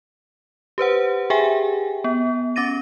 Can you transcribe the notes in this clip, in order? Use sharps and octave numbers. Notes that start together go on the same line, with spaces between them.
G4 B4 C5 F#5
G4 G#4 E5 G5 G#5
B3
C#4 D6 A6 A#6 D#7